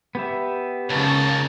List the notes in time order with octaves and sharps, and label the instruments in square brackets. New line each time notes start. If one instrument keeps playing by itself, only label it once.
[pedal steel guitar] B3 G4 E5
[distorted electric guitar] C#2 [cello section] C#3 C#5 [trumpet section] A#3 D#4 A5